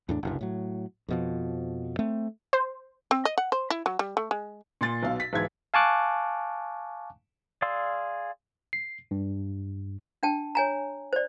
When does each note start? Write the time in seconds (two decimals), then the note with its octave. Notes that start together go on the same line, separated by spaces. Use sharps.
0.09 E2 A2 D4
0.23 F#1 C2 G2
0.41 A2 F#3
1.08 F2 B2 F3
1.99 A3 C4
2.53 C5
3.11 C4
3.25 D#5
3.38 F#5
3.52 C5
3.70 E4
3.86 F#3
3.99 G3
4.17 A3
4.31 G#3
4.81 A#2 C6 A6
5.03 B1 B2 F5
5.20 B6
5.33 B1 G#2 E3 G#6
5.74 F5 G#5 A5 C#6 D6 F#6
7.62 G#4 D5 F5 C6 E6
8.73 C7
9.11 G2
10.23 D4 G5 A5
10.55 C#5 G#5 A#5
11.13 C5 D5